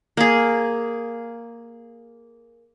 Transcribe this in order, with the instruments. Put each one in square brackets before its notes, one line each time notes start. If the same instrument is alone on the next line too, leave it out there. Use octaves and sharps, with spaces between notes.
[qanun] A#3 G#4